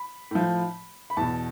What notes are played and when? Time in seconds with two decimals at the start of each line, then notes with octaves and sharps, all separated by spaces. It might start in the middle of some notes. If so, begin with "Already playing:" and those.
Already playing: B5
0.31 A2 F3
1.10 B5
1.17 E2 B2 A5